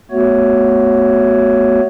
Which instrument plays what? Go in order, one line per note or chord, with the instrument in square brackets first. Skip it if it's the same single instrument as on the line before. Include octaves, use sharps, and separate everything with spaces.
[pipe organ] A3 B3 F#4 C#5